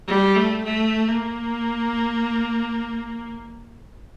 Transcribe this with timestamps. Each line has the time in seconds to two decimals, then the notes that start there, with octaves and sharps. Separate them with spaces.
0.08 G3
0.36 A3
0.65 A3
1.08 A#3